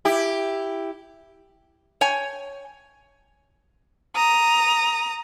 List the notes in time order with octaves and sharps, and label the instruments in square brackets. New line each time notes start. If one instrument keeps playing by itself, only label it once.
[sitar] E4 G4
[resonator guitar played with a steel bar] C#5 G5 G#5
[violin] A#5 D#6